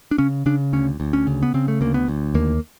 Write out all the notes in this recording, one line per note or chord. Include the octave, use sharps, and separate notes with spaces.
D4
C#3 C#4
C#3 D4
D2 C#4
D2
C#4
C#3
B3
C#3 C4
A3
D2 A#3
B3
D2
D#2 A#3